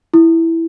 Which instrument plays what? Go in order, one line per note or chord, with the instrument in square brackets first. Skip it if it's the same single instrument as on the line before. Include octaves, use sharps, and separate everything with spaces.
[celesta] E4